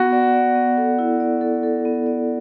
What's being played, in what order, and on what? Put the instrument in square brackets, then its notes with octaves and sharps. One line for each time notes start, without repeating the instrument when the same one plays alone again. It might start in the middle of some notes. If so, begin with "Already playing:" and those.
Already playing: [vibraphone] B3 [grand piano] F#4
[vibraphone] D5
D5
B3
A4
E4
D5
A4
A4
B3
D5